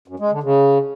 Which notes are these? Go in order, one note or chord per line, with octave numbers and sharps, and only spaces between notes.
F#2
G#3
D3
C#3